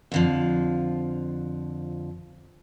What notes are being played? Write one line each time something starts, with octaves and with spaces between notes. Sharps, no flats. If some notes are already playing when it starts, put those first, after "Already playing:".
F2 D3 F3